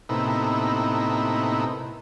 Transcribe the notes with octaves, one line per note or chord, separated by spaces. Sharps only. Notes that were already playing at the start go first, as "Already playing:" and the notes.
A2 C3 A#3 B3 D#4 E4